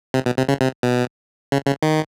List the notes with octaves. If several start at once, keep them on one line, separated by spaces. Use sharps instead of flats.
C3
B2
C3
C#3
C3
B2
C#3
C#3
D#3